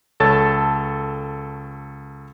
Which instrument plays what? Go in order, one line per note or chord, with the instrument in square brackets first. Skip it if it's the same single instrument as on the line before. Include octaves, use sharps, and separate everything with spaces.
[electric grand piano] C#2 A4 C#5 A5 A6